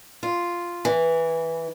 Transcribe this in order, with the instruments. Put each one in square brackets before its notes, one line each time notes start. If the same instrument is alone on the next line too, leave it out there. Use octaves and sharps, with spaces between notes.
[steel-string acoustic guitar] F4
E3